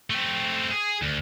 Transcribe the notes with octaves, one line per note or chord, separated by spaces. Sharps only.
A3 C4
G#4
D2